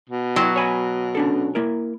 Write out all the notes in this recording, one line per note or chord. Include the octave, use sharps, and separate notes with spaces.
B2
F#3 E4 G5 C6
C#5 G#5 B5
C#4 D4 A4
A#3 E4 A#4